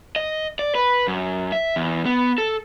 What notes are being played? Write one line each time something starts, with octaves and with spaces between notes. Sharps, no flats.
D#5
D5
B4
F#2
E5
E2
B3
A4